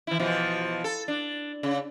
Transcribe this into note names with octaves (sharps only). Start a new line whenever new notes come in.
E3 E4
B2 E3 F3
A4
D4
C#3